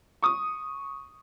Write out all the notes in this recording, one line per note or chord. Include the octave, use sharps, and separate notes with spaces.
C#6 D#6